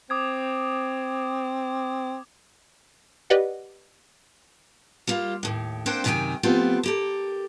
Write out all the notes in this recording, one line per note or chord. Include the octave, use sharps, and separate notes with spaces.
C4 D6 D#6 G#6
G4 B4 D5 D#5 F#5
G3 A#3 F4
D#2 A2
A#3 C4 D4 C5 F#5 G5
F#2 C3 D#3 G#4 G5 G#5
F3 A3 B3 C4 F4 G4
A#3 G4 A4